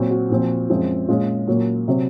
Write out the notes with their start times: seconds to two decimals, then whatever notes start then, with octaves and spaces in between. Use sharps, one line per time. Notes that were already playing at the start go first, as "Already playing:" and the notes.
Already playing: A#2 F#3 C4
0.10 F#4
0.30 A#2 F3 C4
0.69 F#2 F3 G#3 C4
1.08 A#2 G#3 C#4 F4
1.47 A#2 F#3 A#3 C#4
1.88 C3 F#3 C4